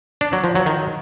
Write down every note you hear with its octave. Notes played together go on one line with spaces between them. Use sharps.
D4
F#3
F3
F#3
D#3